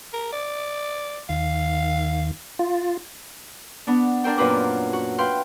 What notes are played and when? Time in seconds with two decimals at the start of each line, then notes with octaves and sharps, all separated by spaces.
0.13 A#4
0.32 D5
1.29 D#2 D#3 F5
2.59 F4
3.87 B3 D4
4.24 D4 A#4 C5 G5
4.37 F#2 A#2 F4 B4 C5 D6
4.93 F#4
5.18 B4 F5 G5 C6